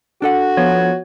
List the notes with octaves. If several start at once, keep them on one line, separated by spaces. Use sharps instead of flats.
D4 F#4 A4 F#5
F3 B3 C#5